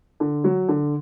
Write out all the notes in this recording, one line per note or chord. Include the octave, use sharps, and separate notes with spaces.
D3
F#3
D3